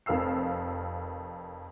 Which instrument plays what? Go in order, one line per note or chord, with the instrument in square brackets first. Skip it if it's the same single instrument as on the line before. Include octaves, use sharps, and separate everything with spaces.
[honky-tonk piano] F1 F2 A#4 F5 E6 C7